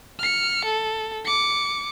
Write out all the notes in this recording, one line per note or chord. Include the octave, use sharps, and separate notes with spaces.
F6 C#7
A4
D6 C#7